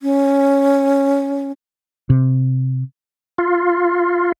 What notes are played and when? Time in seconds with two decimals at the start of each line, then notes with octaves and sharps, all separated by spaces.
0.02 C#4
2.10 C3
3.38 F4